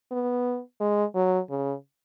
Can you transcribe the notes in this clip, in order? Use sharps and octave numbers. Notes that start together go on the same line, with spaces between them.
B3
G#3
F#3
C#3